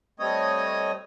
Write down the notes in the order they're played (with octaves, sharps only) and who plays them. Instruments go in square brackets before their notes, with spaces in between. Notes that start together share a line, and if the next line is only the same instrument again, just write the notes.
[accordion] G3 A3 C4 C#5 D#5 D#6